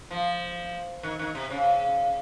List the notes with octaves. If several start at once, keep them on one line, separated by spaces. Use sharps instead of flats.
F3
D#3
D#3
C3
C#3